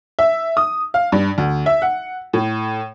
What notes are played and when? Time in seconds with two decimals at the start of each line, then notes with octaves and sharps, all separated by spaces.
0.19 E5
0.57 D#6
0.94 F5
1.12 G2
1.38 D2
1.66 E5
1.82 F#5
2.33 A2